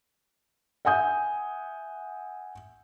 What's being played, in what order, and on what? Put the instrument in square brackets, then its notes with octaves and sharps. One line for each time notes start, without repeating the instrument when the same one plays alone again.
[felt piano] E5 F#5 G#5 D#6 G6